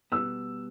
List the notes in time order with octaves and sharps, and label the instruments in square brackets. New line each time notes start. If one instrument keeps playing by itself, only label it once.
[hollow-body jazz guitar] B2 G3 B3 [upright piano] E6